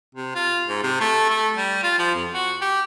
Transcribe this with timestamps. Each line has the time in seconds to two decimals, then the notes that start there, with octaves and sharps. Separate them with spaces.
0.15 C3
0.35 F4
0.68 G#2
0.83 C3
1.00 A3
1.30 A3
1.56 G3
1.83 F4
1.99 F3
2.15 F2
2.34 F#4
2.61 G4